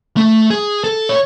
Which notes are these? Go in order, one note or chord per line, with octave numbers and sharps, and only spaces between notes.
A3
G#4
A4
C#5